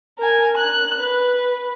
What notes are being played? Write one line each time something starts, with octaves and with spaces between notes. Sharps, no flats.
A#4 G#5
F#6
B4